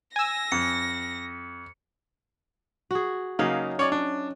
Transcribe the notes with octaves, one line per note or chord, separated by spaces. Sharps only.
G#5 E6 A#6
F2 C#7
F#4 G#4
C#3 F#3 A#3 D#4 F5
C#4 C#5 D5
D4